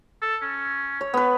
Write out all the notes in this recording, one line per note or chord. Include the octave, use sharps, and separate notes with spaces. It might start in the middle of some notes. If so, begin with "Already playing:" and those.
A4
C#4
C#5
B3 B4